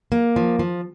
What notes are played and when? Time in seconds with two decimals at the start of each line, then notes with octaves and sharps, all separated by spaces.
0.12 A#3
0.36 F3
0.59 F3